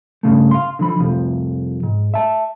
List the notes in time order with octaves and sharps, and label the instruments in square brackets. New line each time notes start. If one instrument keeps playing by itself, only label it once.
[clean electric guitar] G2 C#3 A3
F5 C6
D3 F3 B5
C2 F2 C3 F3
G#2
E5 A5